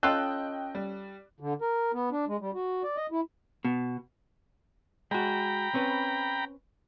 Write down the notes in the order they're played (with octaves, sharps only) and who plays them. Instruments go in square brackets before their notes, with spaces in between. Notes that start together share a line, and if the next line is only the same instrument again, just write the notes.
[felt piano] C#4 [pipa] F4 A4 [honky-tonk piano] D#5 G5 F#6
[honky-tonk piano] G3
[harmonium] D3
A#4
B3
D4
G#3
G3
F#4
D5
D#5
E4
[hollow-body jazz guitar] B2
[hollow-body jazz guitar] G#3 F#4 [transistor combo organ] G5 A#5 B5
[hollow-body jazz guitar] C4 C#4 B4